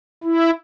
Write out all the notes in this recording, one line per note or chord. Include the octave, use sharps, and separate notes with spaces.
E4